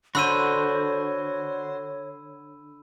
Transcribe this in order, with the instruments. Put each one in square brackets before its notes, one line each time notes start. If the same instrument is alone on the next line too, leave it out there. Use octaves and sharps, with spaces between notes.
[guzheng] D3 [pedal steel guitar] F#4 C5 [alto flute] C#5 [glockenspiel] B5 E6 D#7